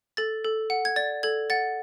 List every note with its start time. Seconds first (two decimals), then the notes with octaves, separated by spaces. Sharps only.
0.17 A4 A6
0.44 A4
0.70 F#5
0.85 G#6
0.96 D5 A6
1.23 A4 G#6
1.50 F#5 A6